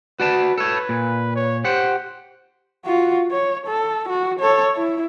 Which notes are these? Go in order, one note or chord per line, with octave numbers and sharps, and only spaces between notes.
F#4 B4 D5 A5
A4 B4 C#5
A#2
C#5
G4 C5 F#5
F4 F#4
C#5
A4
F#4
A4 C#5
E4